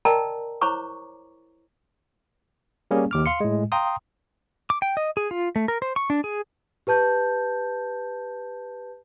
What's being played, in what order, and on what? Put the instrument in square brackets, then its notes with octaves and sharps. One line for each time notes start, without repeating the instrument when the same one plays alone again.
[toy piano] A#4 D5 D#5 G5 A5 A#5
E4 C5 C#5 A#5 C#6 D6
[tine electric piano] G3 A#3 C#4 G#4
D#2 D6 F6
F5 C6 C#7
A2 G#3
F5 G5 A#5 C6 D#6
[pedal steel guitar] D6
G5
D#5
G#4
F4
A3
A#4
C5
C#6
D4
G#4
[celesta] G4 B4 A5 G6